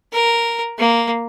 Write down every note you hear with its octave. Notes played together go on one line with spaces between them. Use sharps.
A#4
A#3